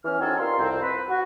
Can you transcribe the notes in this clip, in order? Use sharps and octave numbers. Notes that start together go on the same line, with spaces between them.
E2 E3 C#4 F6
C4 C#4 D#4 F#4 G#4 A4
G3 F4 A#4 C6
C2 F2 C4
B4
F#4